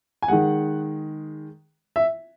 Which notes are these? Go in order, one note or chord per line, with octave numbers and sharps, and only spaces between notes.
G#5
D#3 G#3 F#5
E5